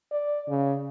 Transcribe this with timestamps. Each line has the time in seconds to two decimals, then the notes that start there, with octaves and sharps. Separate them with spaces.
0.11 D5
0.49 C#3